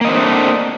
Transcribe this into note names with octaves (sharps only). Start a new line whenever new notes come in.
A3 A#3 C4 D4 D#5